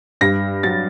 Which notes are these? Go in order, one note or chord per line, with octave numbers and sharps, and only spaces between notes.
G2 A#6
F#3 A6